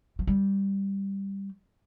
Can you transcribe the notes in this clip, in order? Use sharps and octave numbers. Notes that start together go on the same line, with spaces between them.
F3
G3